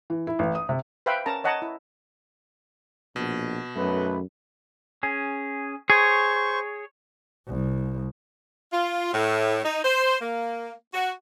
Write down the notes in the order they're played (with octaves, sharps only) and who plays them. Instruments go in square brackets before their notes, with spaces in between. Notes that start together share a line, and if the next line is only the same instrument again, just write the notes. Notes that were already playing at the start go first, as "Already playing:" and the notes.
[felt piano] E3
E4
A1
D#6
C3
[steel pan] B4 C5 E5 F5 G5 B5
C#4 A#4 A5 A#5
C#5 D#5 F#5 A5 A#5
E4
[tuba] A#1 [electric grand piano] B2
[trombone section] B1 A3 B4 [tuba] F#2
[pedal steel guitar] C#4 G#4
[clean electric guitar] G#4 [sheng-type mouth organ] C5 C#6 [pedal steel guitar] C#5
[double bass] C2
[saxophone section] F4
A2
D#4
C5
A#3
F#4